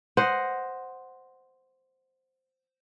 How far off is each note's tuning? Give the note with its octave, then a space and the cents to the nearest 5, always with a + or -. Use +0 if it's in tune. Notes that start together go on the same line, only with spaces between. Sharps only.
C5 +0 D#5 +0 F#5 +0